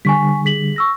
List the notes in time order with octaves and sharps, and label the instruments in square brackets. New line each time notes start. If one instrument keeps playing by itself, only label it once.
[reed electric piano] D3 G3 [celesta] G#5 C#6 B6
[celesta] G#4 B6 F#7
C#6 E6 A#6